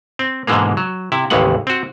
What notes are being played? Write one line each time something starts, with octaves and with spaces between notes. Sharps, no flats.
C4
G#2 B2 D3 E3 G#3 A#3
F#3
C3 E4
A1 D#2 C#3 E3 G#3 F#5
C4 F#4